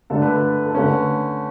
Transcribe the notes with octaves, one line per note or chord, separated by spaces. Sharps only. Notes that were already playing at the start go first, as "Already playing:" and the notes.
D3 A3 D4 A4
B4
A4
A4
D3 A3 C#4 B4